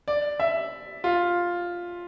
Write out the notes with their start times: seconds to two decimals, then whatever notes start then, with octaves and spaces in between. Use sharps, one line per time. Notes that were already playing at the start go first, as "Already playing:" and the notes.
0.08 D5
0.40 E5
1.04 F4